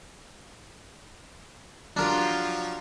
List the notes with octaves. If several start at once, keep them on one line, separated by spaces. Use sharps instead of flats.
F3 F#3 D4 F4 G4 A#4